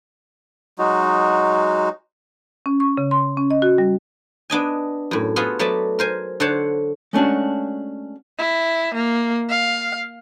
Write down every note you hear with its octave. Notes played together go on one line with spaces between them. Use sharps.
F#3 G#3 D#4 F#4
C#4
C#6
C#3
C6
C#4
D#5
F#4
G3
B3 D4 D#5 G#5
F#2 A2
B3 F4 F#4 G#4 A4
F#3 A3 B3 D5 A5
A#4 C5 G#5
D3 A4 C5 C#5 F#5 A5
G#3 A3 C#4 D4 F#4
E4
A#3
F5